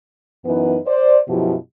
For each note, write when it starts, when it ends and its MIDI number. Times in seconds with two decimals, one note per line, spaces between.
0.44 0.77 42
0.44 0.77 52
0.44 0.77 59
0.44 0.77 63
0.44 0.77 71
0.86 1.16 72
0.86 1.16 74
1.27 1.53 42
1.27 1.53 47
1.27 1.53 53
1.27 1.53 64
1.27 1.53 67